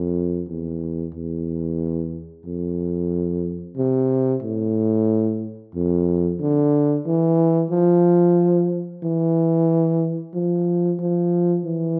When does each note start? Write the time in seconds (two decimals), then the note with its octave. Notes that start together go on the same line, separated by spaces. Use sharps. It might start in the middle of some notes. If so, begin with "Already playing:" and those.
Already playing: F2
0.49 E2
1.14 E2
2.46 F2
3.77 C3
4.43 A2
5.75 F2
6.40 D3
7.06 E3
7.71 F3
9.03 E3
10.34 F3
10.99 F3
11.65 E3